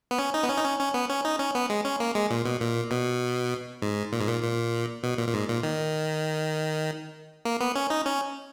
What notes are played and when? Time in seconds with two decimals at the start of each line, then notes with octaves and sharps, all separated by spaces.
0.11 B3
0.19 C#4
0.34 D#4
0.43 B3
0.49 C#4
0.58 D#4
0.64 C#4
0.79 C#4
0.94 B3
1.10 C#4
1.25 D#4
1.39 C#4
1.55 B3
1.70 G#3
1.85 C#4
2.00 A#3
2.15 G#3
2.30 A#2
2.45 B2
2.61 A#2
2.91 B2
3.82 G#2
4.12 A#2
4.20 G#2
4.28 A#2
4.42 A#2
5.03 B2
5.18 A#2
5.28 A#2
5.33 G#2
5.48 A#2
5.63 D#3
7.45 A#3
7.61 B3
7.76 C#4
7.90 D#4
8.06 C#4